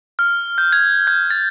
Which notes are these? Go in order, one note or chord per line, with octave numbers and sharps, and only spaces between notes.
F6
G6
G#6
G6
A6